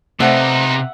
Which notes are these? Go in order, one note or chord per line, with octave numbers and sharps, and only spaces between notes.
C3 A3 B3 D#4 C5 D5 E5 F#5